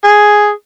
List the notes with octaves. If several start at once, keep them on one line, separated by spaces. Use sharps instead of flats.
G#4